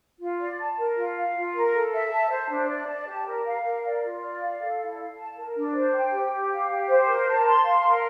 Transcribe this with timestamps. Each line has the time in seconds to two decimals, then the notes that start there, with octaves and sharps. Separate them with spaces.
0.21 F4
0.40 D5
0.59 A5
0.78 A#4
0.97 F4
1.16 F5
1.35 F4
1.54 A#4
1.74 A4
1.93 E5
2.11 A5
2.30 C5
2.50 D4
2.69 D5
2.88 A5
3.07 G4
3.26 A#4
3.45 F5
3.64 A#4
3.83 D5
4.02 F4
4.21 D5
4.40 F5
4.59 A4
4.78 E4
4.98 F5
5.17 A5
5.35 A#4
5.55 D4
5.74 C5
5.93 G5
6.12 G4
6.31 G4
6.50 F5
6.69 G4
6.88 C5
7.07 A#4
7.26 A5
7.46 C6
7.64 F5
7.84 A#4